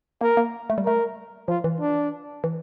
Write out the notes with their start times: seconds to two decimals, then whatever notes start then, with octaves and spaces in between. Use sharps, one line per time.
0.21 A#3 A#4
0.37 A#3
0.70 A3
0.78 G3
0.86 A3 A#4
1.48 F3 F4
1.64 E3
1.81 D4
2.44 E3